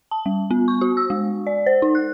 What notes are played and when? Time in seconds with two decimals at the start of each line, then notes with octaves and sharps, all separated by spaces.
0.11 A5
0.26 G3
0.50 B3
0.68 C#6
0.81 F#4
0.97 E6
1.10 G#3
1.47 D5
1.66 C5
1.82 D#4
1.95 F#6